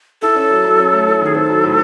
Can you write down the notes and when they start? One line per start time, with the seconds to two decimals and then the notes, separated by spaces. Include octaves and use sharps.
0.22 E4 A4
0.35 C#4
0.50 F#3
0.64 F#3
0.79 C#4
0.93 A3
1.07 E4
1.21 D#3
1.26 G#4
1.35 C4 A4
1.49 F#3
1.64 A2